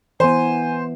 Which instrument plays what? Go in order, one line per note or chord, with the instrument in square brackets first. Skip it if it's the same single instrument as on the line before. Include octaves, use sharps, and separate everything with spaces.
[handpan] E3 B3 [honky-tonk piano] C5 [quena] G#5